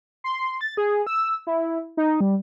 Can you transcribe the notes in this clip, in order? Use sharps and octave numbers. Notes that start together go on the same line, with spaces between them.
C6
A6
G#4
E6
E4
D#4
G3